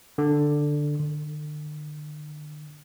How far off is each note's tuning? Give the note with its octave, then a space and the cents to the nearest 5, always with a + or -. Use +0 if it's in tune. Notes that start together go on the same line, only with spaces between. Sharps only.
D3 +5
D3 +40